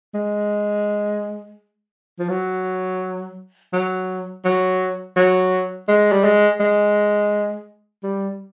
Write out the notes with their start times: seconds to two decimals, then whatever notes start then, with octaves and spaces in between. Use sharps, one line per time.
0.14 G#3
2.19 F3
2.30 F#3
3.73 F#3
4.45 F#3
5.16 F#3
5.88 G#3
6.12 G3
6.24 G#3
6.60 G#3
8.03 G3